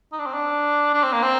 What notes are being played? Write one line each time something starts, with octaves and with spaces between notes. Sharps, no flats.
D#4
D4
C4
D4
D4
C4
A#3
C4